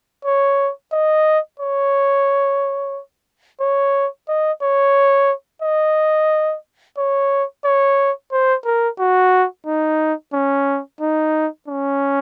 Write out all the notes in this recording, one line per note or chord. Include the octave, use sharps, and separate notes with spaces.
C#5
D#5
C#5
C#5
D#5
C#5
D#5
C#5
C#5
C5
A#4
F#4
D#4
C#4
D#4
C#4